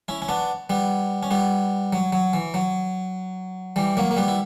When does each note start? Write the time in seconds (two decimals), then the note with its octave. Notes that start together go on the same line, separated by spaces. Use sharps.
0.08 C#4 E4
0.22 C#4
0.29 B3 D4
0.70 G3 B3
1.23 C#4
1.31 G3 B3
1.93 F#3
2.13 F#3
2.33 E3
2.54 F#3
3.76 E3 G3
3.97 F#3 A#3
4.11 A#3
4.17 G3 B3
4.28 E4